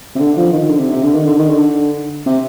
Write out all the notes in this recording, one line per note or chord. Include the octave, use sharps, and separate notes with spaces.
C3
D3
F3
D#3
D3
C3
C3
D3
D#3
D3
D#3
D3
C3